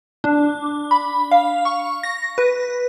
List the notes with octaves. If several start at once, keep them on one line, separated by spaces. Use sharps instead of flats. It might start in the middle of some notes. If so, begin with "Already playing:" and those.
D4
B5
F5
C#6
A#6
B4